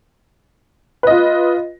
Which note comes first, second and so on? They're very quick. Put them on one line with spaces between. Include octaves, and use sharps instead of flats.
B4 D#5 F4